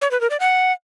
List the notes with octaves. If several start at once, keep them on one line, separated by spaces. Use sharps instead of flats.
C#5
B4
A#4
D5
F#5